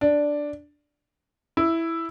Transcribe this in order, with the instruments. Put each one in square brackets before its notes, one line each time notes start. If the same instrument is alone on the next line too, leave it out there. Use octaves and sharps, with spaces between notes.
[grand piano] D4
E4